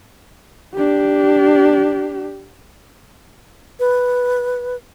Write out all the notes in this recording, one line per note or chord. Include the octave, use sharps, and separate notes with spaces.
D4 G4
B4